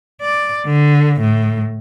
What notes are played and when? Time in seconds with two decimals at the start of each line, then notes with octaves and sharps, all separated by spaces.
0.21 D5
0.66 D3
1.20 A2